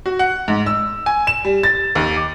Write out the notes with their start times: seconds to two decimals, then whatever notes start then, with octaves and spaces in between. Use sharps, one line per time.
0.06 F#4
0.19 F#5
0.48 G#2
0.66 E6
1.06 G#5
1.27 E7
1.45 G3
1.63 A6
1.95 D#2
2.16 D6